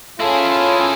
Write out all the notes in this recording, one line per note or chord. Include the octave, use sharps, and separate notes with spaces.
C#4 E4 F4 G#4 A4